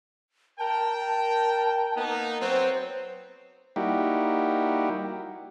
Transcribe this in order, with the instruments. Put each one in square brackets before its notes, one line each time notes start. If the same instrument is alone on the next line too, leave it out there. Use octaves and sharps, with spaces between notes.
[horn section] A#4 G5 [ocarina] A5
[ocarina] A5
[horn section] A#3 B3 D#4
[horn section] F#3 B3 C4 [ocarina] C5
[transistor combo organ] G3 A#3 D#4 E4 F#4 G4